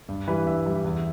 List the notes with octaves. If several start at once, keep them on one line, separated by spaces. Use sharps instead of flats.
G2
E3 G3 B4
G2 E5
E3 G3
E2